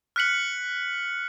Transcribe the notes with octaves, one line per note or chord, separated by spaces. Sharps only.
F6 F#6 B6 C#7 F#7